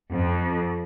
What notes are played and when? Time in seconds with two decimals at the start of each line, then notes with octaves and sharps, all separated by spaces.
0.12 F2